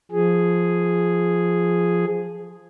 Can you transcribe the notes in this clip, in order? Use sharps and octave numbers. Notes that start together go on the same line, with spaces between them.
F3 G#4